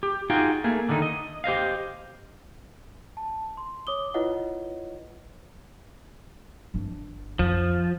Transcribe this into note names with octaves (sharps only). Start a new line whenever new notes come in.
G4
D#4 F4 F#4 G#4 G5
A3 A#3 G#4
D3 D#3 A3 D#4
D#5
G4 C5 D#5 F5
A5
C6
C#5 D6 D#6 G7
E4 F4 B4 C#5 D#5 F#5
G1 D4
F2 F3